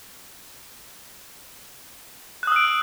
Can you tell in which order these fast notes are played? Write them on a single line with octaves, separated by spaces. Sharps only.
F#6 D#6 E6 D7